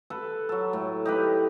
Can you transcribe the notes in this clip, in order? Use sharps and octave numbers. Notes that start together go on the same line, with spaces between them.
A4 B4
F#3 A4
A2
D#4 G4 B4